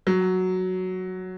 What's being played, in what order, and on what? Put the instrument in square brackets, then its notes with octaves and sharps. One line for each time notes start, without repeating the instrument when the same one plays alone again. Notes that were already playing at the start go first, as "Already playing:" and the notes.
[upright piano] F#3